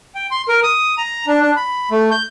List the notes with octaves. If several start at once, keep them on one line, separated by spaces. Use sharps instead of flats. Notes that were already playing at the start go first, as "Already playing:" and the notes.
G5
C6
A#4
D#6
A#5
D4
D4
B5
A3
G6